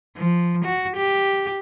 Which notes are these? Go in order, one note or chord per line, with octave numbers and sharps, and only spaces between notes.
F3
F#4
G4